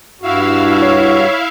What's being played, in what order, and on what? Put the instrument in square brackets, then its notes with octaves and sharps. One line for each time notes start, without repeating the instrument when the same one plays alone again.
[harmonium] G2 F#4 [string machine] E4 E5 F5
[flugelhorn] C#5